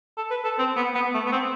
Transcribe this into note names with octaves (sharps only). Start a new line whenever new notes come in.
A4
B4
A4
C4
B3
B3
A3
B3
C4